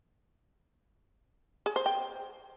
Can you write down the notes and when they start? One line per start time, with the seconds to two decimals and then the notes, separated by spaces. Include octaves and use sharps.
1.66 G#4
1.76 C5
1.86 G5